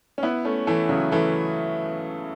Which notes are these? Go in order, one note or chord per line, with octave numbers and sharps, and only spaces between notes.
C#4
B3 E4
A3 C#4
E3 A3
C#3 F#3
E3 A3